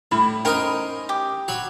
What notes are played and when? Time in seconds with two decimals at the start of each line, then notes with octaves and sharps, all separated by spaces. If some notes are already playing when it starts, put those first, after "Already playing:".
0.12 A2 G3 E4
0.45 C#4 D#4 A#4 C5 D#5 G5
1.09 G4
1.48 F#3 C#5 B5